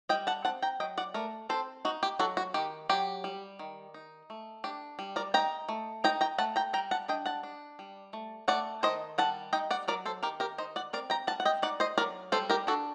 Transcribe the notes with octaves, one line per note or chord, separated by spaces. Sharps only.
G3 D#5 G5
F#5 A5
C4 F#5 A5
G5 A#5
F#3 D#5 G5
D5 F#5
A3 A#4 D5
C4 A4 C5
D#4 F#4
G4
F#3 F#4 A4
F#4
D#3 G4
F#3 G4
G3
D#3
D#4
A3
D4 G4
G3
A#4 D5
D#4 G5 A#5
A3
D#4 G5 A#5
G5 A#5
A3 F#5 A5
G5 A#5
G3 G5 A#5
F#5 A5
D4 D#5 G5
F#5 A5
D4
G3
A3
A3 D5 F#5
D#3 C5 D#5
G3 F#5 A5
D#4 D#5 G5
D5 F#5
F#3 A#4 D5
A4 C5
D#3 G4 A#4
G4 A#4
D#4 C5 D#5
D5 F#5
C4 A#4 D5
G5 A#5
G3 F#5 A5
F#5
D#5 G5
D#4 D5 F#5
C5 D#5
F#3 A#4 D5
G3 A4 C5
G4 A#4
D4 F#4 A4